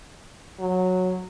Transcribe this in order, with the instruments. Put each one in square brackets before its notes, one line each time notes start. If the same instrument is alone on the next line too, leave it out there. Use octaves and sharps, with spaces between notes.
[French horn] F#3